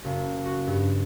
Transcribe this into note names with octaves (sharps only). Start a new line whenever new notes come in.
F#1
F#4
G2